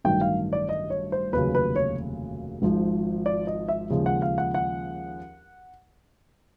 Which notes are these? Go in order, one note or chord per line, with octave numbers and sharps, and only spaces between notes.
A1 G2 D#3 F#3 G5
F5
D5
D#5
C#5
C5
F1 D#2 C#3 F#3 B4
B4
C#5
G#1 G#2 F3
D5
D#5
E5
D#2 C#3 F3 G#3
F#5
F5
F#5
F#5